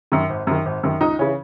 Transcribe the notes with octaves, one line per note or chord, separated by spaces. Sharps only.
F#2 D#3
G#1
F#2 D#3
G#1
F#2 D#3
C#2 D#4
C#3 E3 C#4